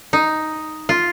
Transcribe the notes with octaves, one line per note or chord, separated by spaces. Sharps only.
D#4
F4